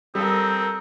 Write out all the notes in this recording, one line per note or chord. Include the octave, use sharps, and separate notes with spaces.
G3 C4 A4 A#4 D#6